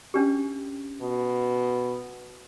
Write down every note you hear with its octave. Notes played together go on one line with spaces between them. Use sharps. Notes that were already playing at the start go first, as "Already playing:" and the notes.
C#4 D4 G4
B2